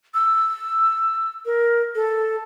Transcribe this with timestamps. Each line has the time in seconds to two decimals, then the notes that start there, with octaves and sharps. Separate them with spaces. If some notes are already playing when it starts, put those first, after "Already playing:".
0.14 E6
1.46 A#4
1.95 A4